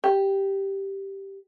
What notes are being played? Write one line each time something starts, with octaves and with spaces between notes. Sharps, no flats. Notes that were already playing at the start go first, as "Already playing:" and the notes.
G4